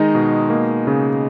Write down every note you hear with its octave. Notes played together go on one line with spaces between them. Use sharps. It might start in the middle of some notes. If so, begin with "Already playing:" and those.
Already playing: D#3 G#3 D#4 D#5
B2
A#3
C#3